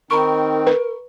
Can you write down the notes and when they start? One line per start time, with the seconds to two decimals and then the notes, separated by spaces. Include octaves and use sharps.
0.11 D#3 C4 D#4 A#4 A#5 B5 C#6
0.67 B4